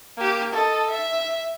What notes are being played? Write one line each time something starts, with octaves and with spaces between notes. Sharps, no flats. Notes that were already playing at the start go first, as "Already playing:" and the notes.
A#3 G4
A4 D#5
E5